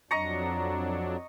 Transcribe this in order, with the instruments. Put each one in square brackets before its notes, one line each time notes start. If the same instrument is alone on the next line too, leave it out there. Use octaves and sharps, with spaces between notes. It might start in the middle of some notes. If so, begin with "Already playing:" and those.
[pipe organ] F2 F#3 D4 [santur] D#5 A#5 C#6